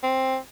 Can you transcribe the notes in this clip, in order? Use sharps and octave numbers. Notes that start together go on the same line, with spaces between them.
C4